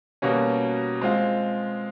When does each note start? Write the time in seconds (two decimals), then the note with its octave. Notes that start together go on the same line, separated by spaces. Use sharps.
0.22 B2 G3 A#3 C#4 F#4
1.01 G#3 C4 F4